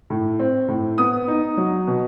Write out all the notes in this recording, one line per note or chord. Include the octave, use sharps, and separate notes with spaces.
A2
C4
A2
B3 D#6
D#4
F#3
B2